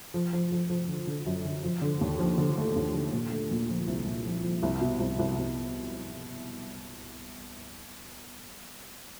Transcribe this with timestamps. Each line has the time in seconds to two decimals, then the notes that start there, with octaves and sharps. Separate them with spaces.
0.14 F3
0.33 F3
0.52 F3
0.70 F3
0.88 D3
1.07 D3
1.26 F#2
1.45 D3
1.63 F3
1.82 D3
2.01 D#2
2.19 F3
2.38 D3
2.58 A3
2.76 D#2
2.94 D3
3.13 A#2
3.32 A3
3.51 A#2
3.70 F3
3.87 C2
4.06 A#2
4.25 F3
4.43 F3
4.63 C2
4.81 B2
5.00 C2
5.19 C2
5.38 C2